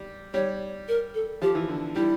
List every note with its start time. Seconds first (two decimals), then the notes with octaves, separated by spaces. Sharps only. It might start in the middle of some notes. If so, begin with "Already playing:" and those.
Already playing: G3
0.34 G3 C#5
0.88 A#4
1.14 A4
1.42 F3 G4
1.55 E3
1.68 D3
1.95 G3 E4